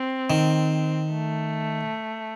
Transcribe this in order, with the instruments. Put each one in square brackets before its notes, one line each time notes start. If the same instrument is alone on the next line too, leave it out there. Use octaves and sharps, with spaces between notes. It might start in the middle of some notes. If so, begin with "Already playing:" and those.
Already playing: [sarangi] C4
[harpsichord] D#3
[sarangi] A3